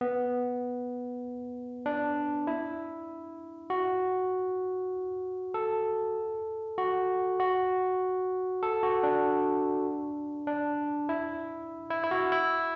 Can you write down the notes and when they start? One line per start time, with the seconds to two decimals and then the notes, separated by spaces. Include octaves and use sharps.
0.01 B3
1.86 D4
2.47 E4
3.70 F#4
5.54 A4
6.78 F#4
7.40 F#4
8.63 A4
8.83 F#4
9.03 D4
10.47 D4
11.09 E4
11.90 E4
12.04 E4
12.11 F#4
12.32 E4